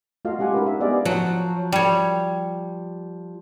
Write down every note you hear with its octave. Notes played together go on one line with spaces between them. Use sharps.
A3 F4 F#4 A4 D#5 F5
G#3 C#4 G4 F#5 G#5
D#4 F4 A#4 B4
D4 E5
B3 G4 G#4 D5 D#5 F5
F3 F#3
G3 C#5